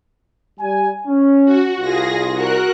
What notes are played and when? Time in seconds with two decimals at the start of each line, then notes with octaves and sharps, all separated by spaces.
0.60 G3 G#5
1.07 C#4
1.45 F#4
1.81 C2 F4 G#4 A#6
2.35 F#4 A#4 F#6